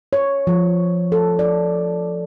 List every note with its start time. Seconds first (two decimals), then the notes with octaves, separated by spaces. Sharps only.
0.13 C#5
0.47 F3
1.12 A4
1.39 D5